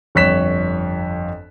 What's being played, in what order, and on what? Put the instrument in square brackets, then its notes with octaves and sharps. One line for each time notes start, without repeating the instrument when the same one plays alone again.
[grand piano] G1 F2 C#5 F#6 B6 E7